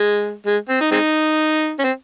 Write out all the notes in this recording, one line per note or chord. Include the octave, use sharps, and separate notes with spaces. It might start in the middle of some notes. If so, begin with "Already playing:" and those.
Already playing: G#3
G#3
C4
D#4
G#3 C4 D#4
C#4
C4